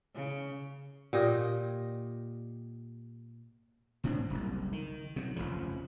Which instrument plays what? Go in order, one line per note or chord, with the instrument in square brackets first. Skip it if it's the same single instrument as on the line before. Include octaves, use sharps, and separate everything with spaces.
[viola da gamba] C#3
[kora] A#2 G4 D#5
[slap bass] C#2 A2 C4 D4
F#1 C2
D#3
C3 F#3
F1 C#2 C#3 F3